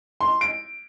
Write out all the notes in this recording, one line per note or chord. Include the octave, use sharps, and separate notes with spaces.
C6
D7